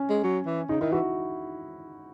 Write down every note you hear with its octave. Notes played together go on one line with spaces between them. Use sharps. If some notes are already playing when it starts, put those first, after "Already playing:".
Already playing: C#4
G#3
F#3
E3
C#3 D#4
D#3 E4
E3 F#4